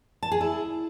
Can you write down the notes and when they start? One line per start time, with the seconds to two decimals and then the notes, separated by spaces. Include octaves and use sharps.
0.23 A5
0.32 G#4
0.41 E4